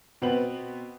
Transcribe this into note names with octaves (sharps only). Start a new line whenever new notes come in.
B2 B3 C4 B4 F#7